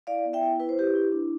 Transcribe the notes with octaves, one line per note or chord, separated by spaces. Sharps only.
E4 D5 F5
B3
E5 G5
E4
E4 B4
C5
E4 G4 B4
E4
D4